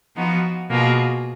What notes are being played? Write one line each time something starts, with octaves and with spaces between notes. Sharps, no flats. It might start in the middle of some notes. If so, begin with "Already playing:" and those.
F3 B3 D#4 F#4
B2 A#3 F4 G#4